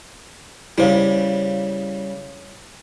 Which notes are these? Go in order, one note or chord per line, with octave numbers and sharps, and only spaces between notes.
C#3 G3 E4 C5 F5